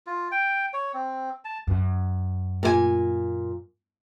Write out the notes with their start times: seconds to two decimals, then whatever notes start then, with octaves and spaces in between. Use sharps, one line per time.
0.07 F4
0.32 G5
0.73 C#5
0.94 C4
1.45 A5
1.67 F#2
2.63 A#2 A#4 G#5